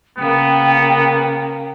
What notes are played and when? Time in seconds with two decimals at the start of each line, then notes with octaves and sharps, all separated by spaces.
0.18 C#3 A#3 B3 G5